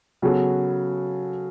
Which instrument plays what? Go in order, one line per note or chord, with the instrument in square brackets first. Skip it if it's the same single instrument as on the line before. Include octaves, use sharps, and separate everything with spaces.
[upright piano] C#3 F#3 B3 F#4 A4